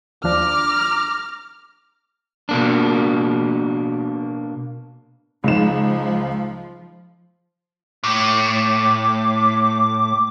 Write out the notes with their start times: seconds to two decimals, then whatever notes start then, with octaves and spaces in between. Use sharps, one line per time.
0.24 D#2 F3 D4 A#5 D6 F6
2.49 B2 A#3 D4
5.44 C#2 F3 D#4 E7
8.04 A2 D6